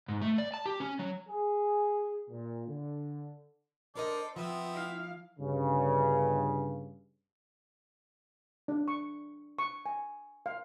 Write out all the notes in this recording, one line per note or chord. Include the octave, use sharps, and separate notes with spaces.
G#2
A3
D5
A5
G4
C#4
F#3
G#4
A#2
D3
D4 A4 A#4 C5 D5 D#5
F3 B3 C4 F4 E5
E4 F5
G1 G2 C#3
D4
C#6
C#6
G#5
F5